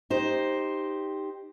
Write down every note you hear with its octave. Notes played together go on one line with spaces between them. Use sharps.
D#4 G4 C5